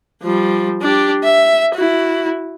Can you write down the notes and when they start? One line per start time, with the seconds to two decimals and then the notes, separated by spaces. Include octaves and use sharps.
0.22 F3 G3
0.81 D4 G4
1.23 E5
1.75 E4 F#4